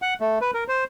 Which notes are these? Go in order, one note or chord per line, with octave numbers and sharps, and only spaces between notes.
F#5
A3
B4
A#4
C5